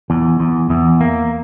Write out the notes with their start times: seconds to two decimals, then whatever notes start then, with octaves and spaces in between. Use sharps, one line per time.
0.10 E2
0.40 E2
0.70 E2
1.01 A#3